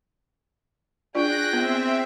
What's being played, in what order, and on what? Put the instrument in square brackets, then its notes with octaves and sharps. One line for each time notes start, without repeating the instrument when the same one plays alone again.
[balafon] D4 F4 D5 [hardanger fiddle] G#4 G5 [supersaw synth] F#6 A#6
[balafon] B3 [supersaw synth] C4 E5